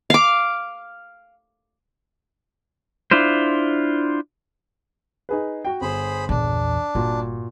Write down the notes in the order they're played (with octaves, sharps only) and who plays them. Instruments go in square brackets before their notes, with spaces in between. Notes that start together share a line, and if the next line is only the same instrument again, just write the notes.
[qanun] F5 D6
[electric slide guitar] D4 E4 F4 C5
[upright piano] D#4 G#4 B4
F#4 G5
[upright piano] G1 [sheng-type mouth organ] G#4 C5 B5
[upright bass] A#1 E2 [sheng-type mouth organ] D4
[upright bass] G1 [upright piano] A#2 F#4